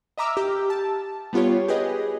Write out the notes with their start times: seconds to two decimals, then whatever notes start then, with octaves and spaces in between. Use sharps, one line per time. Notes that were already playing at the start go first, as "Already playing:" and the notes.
0.18 D#5 E5 A#5 D6 E6 F6
0.37 G4
0.70 A5
1.33 G3 B3 F4 G4 C#5
1.68 G4 G#4 B4 D#5